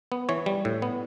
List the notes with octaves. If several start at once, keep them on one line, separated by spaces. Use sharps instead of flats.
B3
E3 C#5
G3
A2
B3